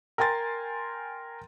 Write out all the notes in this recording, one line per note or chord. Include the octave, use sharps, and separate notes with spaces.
A#4 G5 G#5 C6 A6